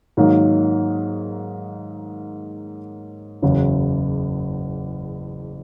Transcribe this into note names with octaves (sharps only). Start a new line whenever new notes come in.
G#2 D#3 F#3 A#3 D#4
F#1 E2 C#3 F#3